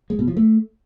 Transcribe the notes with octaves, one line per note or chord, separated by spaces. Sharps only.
G#3
B2
F3
A3